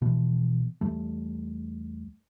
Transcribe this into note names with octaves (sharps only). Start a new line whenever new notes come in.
B2 E3 F3
E2 G3 A3